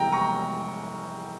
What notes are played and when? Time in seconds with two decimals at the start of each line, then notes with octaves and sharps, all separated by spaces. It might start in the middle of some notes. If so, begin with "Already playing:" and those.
Already playing: F1 E2 E3 G3 G5 A#5
0.12 A#5 C#6